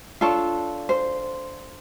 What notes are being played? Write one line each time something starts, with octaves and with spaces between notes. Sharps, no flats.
D4 F4 A4 C#5
C5